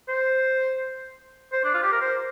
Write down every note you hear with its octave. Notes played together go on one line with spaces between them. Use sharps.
C5
C5
D4
F4
G4
A#4
C5